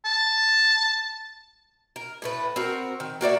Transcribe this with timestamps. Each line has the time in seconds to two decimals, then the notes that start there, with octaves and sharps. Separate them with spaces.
0.05 A5
1.96 A#4
2.22 A2 A3 B4
2.56 C4 F#4 A#4
3.00 D#3
3.21 A#3 F#4 D5 E5